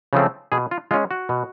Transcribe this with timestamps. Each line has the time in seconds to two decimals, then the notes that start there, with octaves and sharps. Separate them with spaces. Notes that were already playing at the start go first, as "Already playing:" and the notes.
0.13 C#3 F3 A3 C4
0.52 B2 G#4
0.71 F4
0.91 G#3 C#4 F4
1.11 F#4
1.29 B2